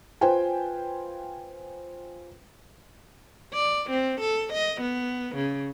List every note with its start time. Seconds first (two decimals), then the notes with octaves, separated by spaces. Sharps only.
0.21 F4 B4 C5 G5 G#5
3.54 D5
3.90 C4
4.20 A4
4.53 D#5
4.81 B3
5.36 C#3